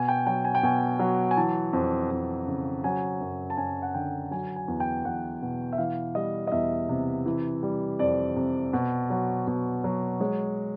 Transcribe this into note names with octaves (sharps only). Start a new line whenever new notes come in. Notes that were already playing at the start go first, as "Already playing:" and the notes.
Already playing: B2 G#5
G5
F#3 G5
G#5
G5
B2 G#5
F#3
G#5
E3 A5
F2
F2
C#3
F#3 G#5
F#2
A5
F#2 G#5
F#5
D3 G5
F#3 G#5
G#5
E2
G5
E2 F#5
B2
E5
E3 F5
G3 D#5
D#5
E2 E5
C3
E3
G3
F2 D5
C3
B2
F#3
B2
F#3
G#3 C#5